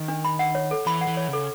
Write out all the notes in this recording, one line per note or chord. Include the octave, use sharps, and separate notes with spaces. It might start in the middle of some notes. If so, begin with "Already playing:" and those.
Already playing: D#3
D4
B5
F#5
C#5
A4
E3 B5
F#5
E3
C#5
C#3
A4